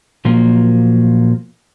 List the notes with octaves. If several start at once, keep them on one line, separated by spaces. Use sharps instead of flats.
A#2 F3 F#3 A#3